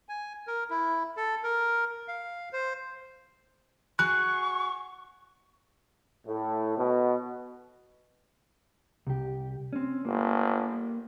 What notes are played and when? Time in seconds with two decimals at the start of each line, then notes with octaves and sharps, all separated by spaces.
0.09 G#5
0.47 A#4
0.70 E4
1.17 A4
1.43 A#4
2.08 F5
2.53 C5
3.99 F#4 G#4 C#6 F#6
6.27 A2
6.78 B2
9.07 C2 G4
9.73 C4 C#4
10.05 G1 A#3